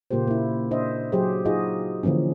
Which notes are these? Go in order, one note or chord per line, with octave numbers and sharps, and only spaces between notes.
A#2 C#3 A#3 F4 G4 C5
A#3 E4
D4 C5 D#5 E5
F#3 G4 G#4 C5
D#4 F4 F#4 G#4 D#5
D3 E3 F3 A#3 C#4